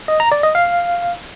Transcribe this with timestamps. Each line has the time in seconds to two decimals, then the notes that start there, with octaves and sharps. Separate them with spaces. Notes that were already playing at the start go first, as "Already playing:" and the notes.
0.08 D#5
0.20 A#5
0.32 D5
0.43 D#5
0.55 F5